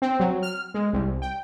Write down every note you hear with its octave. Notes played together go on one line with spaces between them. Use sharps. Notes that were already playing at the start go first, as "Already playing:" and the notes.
C4
F#3
F6
G#3
C2
G5